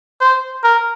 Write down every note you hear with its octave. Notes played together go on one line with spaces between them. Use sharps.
C5
A#4